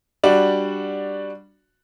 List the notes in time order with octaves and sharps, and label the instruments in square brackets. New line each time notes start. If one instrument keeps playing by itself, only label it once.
[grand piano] G3 D4 F#4